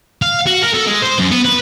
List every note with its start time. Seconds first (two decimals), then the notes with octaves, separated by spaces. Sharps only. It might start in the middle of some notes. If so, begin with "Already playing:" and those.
0.22 F5
0.46 F#4
0.62 A#4
0.74 A4
0.87 G#3
1.02 C5
1.18 F#2
1.31 B3
1.45 B4